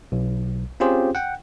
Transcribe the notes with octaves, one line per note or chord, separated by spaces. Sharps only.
B1
C4 C#4 F4 G4 G#4 C5
F#5 G5